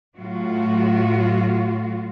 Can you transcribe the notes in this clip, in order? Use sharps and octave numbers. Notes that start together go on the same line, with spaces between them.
A2 F#3 F4 F#4